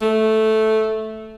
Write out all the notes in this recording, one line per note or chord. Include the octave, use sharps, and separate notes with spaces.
A3